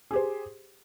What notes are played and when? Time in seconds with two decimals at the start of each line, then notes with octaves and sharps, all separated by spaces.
0.11 G#4
0.13 G4
0.16 C5